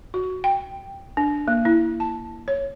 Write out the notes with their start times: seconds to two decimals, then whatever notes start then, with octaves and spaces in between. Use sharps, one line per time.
0.14 F#4
0.44 G5
1.17 D4
1.48 A#3
1.65 E4
2.00 A5
2.48 C#5